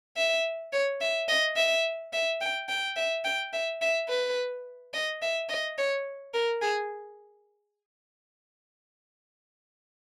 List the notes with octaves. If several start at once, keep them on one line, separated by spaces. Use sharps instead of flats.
E5
C#5
E5
D#5
E5
E5
G5
G5
E5
G5
E5
E5
B4
D#5
E5
D#5
C#5
A#4
G#4